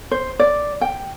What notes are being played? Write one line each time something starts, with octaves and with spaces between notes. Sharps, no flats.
C5
D5
G5